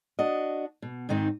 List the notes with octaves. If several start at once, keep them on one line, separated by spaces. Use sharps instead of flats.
D4 F#4 D#5
B2
G#2 D#3 C4 D#4